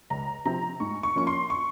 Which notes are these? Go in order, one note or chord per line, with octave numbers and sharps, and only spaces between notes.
C#2 A#5
C3 F3 C4 A#5
G#2 C#6
C#6
F3 A#3 C#4 C#6
C6
C#6